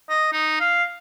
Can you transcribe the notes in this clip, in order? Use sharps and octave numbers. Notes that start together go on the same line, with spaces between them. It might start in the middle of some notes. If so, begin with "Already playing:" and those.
D#5
D#4
F5